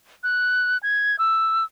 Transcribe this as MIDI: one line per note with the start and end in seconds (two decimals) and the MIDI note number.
0.23 0.78 90
0.83 1.16 92
1.19 1.64 88